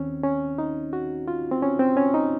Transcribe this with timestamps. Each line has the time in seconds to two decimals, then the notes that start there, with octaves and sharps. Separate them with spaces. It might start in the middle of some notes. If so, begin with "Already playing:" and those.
Already playing: D#2 D#3 C4 C#4
0.24 C#4
0.58 D#4
0.93 F#4
1.28 F4
1.51 C4
1.62 C#4
1.79 C4
1.97 C#4
2.14 D#4